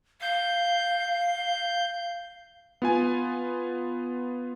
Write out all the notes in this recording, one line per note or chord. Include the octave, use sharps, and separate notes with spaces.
F5 G6
B3 F4 G#5